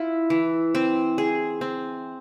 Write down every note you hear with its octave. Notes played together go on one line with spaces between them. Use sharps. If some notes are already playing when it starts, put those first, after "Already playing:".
Already playing: E4 F4
E3
C4
G#4
C4